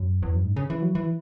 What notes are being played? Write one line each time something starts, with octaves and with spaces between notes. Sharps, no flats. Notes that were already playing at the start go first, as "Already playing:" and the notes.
Already playing: F#2
E2
F#2
G#2
C#3
E3
F#3
E3